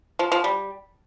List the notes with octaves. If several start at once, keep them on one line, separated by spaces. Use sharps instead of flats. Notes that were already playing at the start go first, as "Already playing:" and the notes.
F3
F3
G3